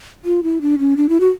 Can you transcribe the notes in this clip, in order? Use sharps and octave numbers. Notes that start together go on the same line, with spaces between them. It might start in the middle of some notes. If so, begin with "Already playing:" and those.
F4
E4
D4
C#4
D4
E4
F#4